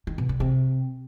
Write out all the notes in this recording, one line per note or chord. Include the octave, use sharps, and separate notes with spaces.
D#3
B2
D3
C3